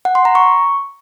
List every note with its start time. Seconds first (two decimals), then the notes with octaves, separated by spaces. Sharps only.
0.05 F#5
0.15 C6
0.25 A#5
0.35 C#6